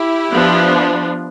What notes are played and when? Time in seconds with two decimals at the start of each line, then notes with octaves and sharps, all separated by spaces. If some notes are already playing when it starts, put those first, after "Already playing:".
Already playing: E4 G4
0.31 F3 B3 D4